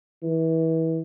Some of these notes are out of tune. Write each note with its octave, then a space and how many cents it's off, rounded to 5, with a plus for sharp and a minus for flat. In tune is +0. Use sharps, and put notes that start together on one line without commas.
E3 -30